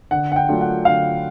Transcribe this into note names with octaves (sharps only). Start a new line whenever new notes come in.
D3 F#5
F#5
G5
F#3 A3 D4 F4
F#5
D3 F5